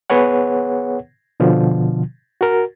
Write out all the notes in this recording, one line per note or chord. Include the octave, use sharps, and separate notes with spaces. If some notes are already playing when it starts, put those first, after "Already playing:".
B3 G#4 B4 C#5 F#5
B2 D3 F3
F#4 A#4